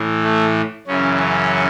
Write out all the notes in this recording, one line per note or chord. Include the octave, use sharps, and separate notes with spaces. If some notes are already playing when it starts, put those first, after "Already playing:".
Already playing: A2 E3
A3
F#2 C#3 E3 C#4
C#4